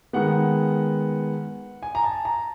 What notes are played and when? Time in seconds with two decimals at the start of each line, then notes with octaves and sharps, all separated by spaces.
0.13 D#3 G#3 B3 F#5
1.83 G#5
1.95 A#5
2.04 A5
2.25 A#5